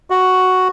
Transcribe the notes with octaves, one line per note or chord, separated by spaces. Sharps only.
F#4